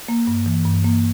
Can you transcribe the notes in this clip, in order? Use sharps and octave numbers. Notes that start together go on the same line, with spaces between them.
A#3
G2
E3
G2
A#3